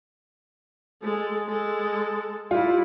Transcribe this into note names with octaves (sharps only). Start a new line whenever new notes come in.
G#3 A4
G#3 A4
G3 E4 F4